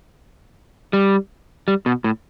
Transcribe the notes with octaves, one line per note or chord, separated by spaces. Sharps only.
G3
G3
B2
A2